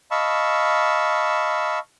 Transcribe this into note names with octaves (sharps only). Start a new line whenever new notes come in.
D#5 F5 A5 B5 C#6 E6